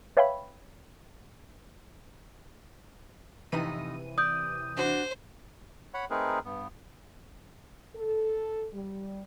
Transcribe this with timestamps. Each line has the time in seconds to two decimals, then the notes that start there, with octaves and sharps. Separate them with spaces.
0.17 B4 C#5 E5 F5 G5 B5
3.52 F2 A2 C3 E3 D#4 D#7
4.18 D5 D#6 G6
4.77 D4 F#4 C5
5.94 C#5 F#5 B5
6.10 A3 C4 D#4 G#4 A#4 B4
6.45 G2 B3
7.96 A4
8.73 G3